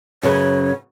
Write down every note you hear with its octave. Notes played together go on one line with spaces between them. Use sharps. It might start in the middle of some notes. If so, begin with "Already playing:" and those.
F#2 C#3 B4 C#5